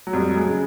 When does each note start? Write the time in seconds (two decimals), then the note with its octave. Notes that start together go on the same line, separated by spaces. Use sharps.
0.07 F#3
0.13 F2 G3
0.29 F#3
0.36 G#3
0.45 C#3